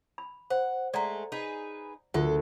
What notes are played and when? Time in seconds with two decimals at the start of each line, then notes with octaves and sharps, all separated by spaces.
0.18 B5
0.50 C5 F#5
0.94 G#3 A3 D5 F#5 A#5
1.32 D#4 G#4 B4
2.14 D2 F4 A4 A#4 F#5